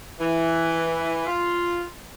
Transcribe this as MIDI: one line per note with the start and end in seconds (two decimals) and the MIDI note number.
0.19 1.26 52
1.27 1.83 65